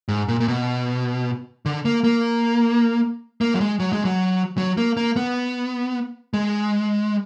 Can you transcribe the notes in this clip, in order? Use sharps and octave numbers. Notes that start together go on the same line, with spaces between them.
G#2
A#2
A#2
B2
D3
A#3
A#3
A#3
F#3
G#3
F#3
G#3
F#3
F#3
A#3
A#3
B3
G#3